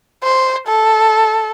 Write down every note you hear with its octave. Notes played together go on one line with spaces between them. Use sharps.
C5
A4